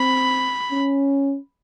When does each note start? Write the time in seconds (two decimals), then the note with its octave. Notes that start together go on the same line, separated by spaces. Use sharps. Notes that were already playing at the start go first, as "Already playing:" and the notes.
Already playing: C4 B5
0.71 C#4